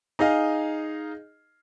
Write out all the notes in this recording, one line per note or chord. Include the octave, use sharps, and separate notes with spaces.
D#4 G#4 D#5 F5